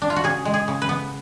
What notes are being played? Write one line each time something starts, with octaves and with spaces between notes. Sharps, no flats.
D4
F4
F#4
C#3 G#4
G#3
G#4
C#3
B4
B3